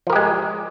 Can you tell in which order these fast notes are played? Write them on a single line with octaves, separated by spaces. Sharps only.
F3 A#4 G4 G#3